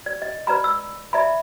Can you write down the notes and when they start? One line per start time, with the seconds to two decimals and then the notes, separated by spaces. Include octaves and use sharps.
0.06 D5
0.22 D#5
0.47 B4 D5 A#5 B5
0.64 E6
1.13 D5 E5 A#5 B5